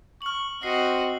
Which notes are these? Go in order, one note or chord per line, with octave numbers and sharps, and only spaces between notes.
C#6 F6 F#7
C4 F#4 D#5 C7 F#7